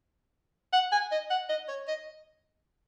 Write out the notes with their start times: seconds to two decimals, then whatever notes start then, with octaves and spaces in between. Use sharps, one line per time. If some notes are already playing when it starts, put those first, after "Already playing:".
0.73 F#5
0.92 G#5
1.11 D#5
1.30 F#5
1.49 D#5
1.68 C#5
1.88 D#5